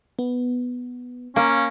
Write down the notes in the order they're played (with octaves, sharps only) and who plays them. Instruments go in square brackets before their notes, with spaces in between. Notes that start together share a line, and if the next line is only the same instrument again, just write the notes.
[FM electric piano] B3
[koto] A#3 [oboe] C#4